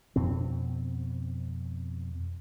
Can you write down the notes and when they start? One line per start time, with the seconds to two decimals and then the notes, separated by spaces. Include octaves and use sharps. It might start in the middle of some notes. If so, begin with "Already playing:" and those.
0.16 F2 B2 C4